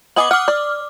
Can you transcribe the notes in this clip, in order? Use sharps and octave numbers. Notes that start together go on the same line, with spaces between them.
B3 D#5 G#5 D6 D#6 F#7
F#5 D6 F6
D5